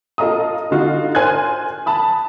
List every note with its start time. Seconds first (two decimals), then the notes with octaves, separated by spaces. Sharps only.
0.18 F4 A4 D#5 F5 A#5 D#6
0.71 D3 D#4 F4 F#4
1.15 C5 G#5 C6 F6 F#6 G#6
1.86 A5 B5 D#6